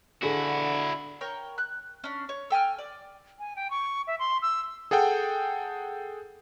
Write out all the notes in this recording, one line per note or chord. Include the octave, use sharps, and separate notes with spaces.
D3 E4 F#4 G#4 A4
A#4 C#5 G5
F#6
C#4 D4
C#5
A4 G5 G#5 F6
D5
G#5
G5
C#6
E5
C6
E6
G#4 A4 F#5 G5